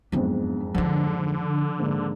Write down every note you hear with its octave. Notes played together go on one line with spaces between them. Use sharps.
F#1 F2 G#2 B3 D4
D3 F3 D#4
G#2 A#3 D4